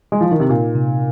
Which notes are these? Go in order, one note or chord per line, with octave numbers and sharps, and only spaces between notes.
G#3
F3
D#3
C3
A#2 D#4
C3